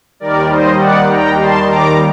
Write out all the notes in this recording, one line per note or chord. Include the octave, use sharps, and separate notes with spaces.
D#2 D#3 G3 A#4 D5
C5 D#5
D5 F#5
G5 A#5
A5 C6
A#5 D6